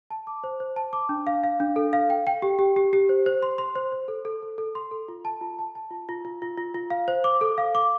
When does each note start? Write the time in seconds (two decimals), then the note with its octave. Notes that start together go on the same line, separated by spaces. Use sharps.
0.11 A5
0.27 D6
0.44 C5
0.60 C5
0.76 A5
0.93 D6
1.09 D4
1.27 F5
1.44 F5
1.60 D4
1.76 A4
1.93 F5
2.10 G5
2.27 G5
2.42 G4
2.59 G4
2.76 G4
2.93 G4
3.09 C5
3.26 C5
3.43 C6
3.58 C6
3.76 C5
3.92 C5
4.08 A4
4.25 A4
4.43 A4
4.58 A4
4.75 C6
4.91 A4
5.08 F4
5.25 A5
5.41 F4
5.59 A5
5.75 A5
5.91 F4
6.09 F4
6.25 F4
6.42 F4
6.57 F4
6.74 F4
6.90 F5
7.08 C5
7.24 D6
7.41 A4
7.58 F5
7.75 D6